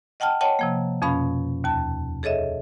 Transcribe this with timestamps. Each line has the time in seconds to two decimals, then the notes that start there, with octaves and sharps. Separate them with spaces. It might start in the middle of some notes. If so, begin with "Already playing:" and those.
0.20 D#5 F#5 G5 A5 F6
0.41 C#5 D#5 F#5 G5 A5
0.59 C3 F3 A#3
1.02 F2 B2 C#4 F5 B5
1.64 D#2 A5
2.23 G#4 A4 C#5 D#5 E5